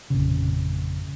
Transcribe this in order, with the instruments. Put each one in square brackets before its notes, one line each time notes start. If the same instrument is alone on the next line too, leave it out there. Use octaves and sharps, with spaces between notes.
[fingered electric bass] G#1 F2 A#2 C#3